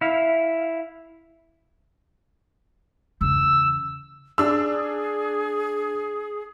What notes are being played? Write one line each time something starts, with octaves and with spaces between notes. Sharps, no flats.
E4 F5
E2 C#3 E6
D4 G#4 E6